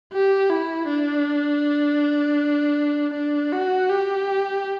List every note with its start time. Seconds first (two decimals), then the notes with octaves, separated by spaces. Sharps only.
0.13 G4
0.50 E4
0.88 D4
3.14 D4
3.52 F#4
3.90 G4